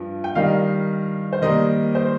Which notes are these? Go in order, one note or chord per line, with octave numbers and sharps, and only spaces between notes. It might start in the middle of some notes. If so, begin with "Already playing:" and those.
Already playing: G2 F3
G5
D#3 G3 D#4 F5
C5
D#3 G3 A#3 D#5
C5